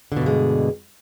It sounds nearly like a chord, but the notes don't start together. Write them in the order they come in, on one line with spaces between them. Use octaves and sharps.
D3 B2 G2 G#3